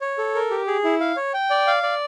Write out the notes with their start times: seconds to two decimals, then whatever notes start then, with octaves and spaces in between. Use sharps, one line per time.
0.01 C#5
0.18 A4
0.35 A#4
0.51 G4
0.67 G#4
0.84 E4
1.00 F5
1.16 C#5
1.34 G5
1.50 D5
1.67 F5
1.83 D5